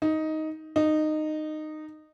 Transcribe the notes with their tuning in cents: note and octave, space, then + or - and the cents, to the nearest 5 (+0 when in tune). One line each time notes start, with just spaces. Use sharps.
D#4 +10
D#4 -15